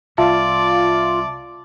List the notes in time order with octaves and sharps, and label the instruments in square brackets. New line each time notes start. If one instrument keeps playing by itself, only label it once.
[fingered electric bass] C2 [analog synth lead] F4 [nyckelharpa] D5 [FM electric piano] E5 A5